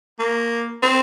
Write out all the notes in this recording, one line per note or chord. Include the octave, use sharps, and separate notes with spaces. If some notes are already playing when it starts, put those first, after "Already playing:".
A#3
C4